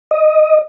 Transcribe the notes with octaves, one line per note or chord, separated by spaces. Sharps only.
D#5